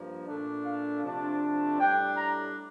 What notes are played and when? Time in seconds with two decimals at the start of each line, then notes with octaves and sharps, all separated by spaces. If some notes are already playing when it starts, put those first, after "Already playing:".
Already playing: G2 F3 A#3
0.27 A#2 A3 D4
0.66 F5
1.04 C3 F3 A3 D4
1.80 A2 G3 D4 G5
2.17 A#5